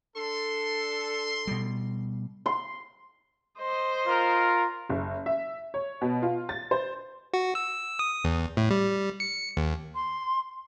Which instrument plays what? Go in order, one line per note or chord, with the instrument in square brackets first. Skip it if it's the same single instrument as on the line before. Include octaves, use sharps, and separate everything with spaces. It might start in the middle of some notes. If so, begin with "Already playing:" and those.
[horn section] D4 A4 [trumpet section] C6
[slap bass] B2 G3
[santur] C6
[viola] C5 D#5
[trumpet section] F4 A#4
[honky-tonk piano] F#1
E5
C#5
B2
F4
A6
C5
[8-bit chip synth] F#4
E6
D#6
E2
A2
G3
C#7
D#2
[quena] C6